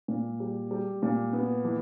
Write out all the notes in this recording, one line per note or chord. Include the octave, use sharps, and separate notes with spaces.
A#2
G3
G3
A#2
B3
E3